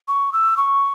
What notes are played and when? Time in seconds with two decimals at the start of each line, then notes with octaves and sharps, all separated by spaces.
0.08 C#6
0.33 E6
0.57 C#6